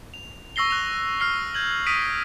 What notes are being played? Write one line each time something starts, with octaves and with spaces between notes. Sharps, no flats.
F7
C#6 E6 A#6 C7 G7
F#6 F7
E6 F6 C7 G7
G6 G#6 F#7
D#6 A#6 B6 D7 D#7